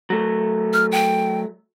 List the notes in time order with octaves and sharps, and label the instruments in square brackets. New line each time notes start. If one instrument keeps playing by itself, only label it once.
[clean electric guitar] F#3 A3
[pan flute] F6
G5